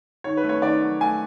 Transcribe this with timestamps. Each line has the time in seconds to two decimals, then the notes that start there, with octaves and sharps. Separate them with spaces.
0.24 D#3 C#5
0.37 B4
0.43 A3
0.49 C#5
0.62 D#3 D5
0.82 F#3
1.01 A3 G#5